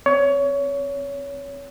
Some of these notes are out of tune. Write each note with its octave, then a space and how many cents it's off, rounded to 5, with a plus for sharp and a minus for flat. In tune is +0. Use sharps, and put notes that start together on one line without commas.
C4 +0 C#5 +25